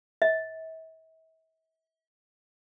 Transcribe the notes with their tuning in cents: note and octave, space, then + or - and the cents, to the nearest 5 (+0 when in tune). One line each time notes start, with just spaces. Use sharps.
E5 -40